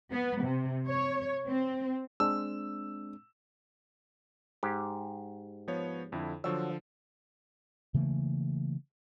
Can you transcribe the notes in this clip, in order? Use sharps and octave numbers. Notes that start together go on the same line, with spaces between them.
B3
C3
C#5
C4
G#3 C4 D4 E6
G#2 G4
F3 B3 C#5
F2 D3 E4
D3 F3 F#3 E6
C#3 E3 A3 A#3